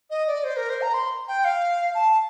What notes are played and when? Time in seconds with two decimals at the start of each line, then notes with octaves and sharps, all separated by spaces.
0.10 D#5
0.27 D5
0.43 C5
0.56 A#4
0.69 C5
0.81 A#5
0.93 C6
1.27 G5
1.44 F5
1.94 A5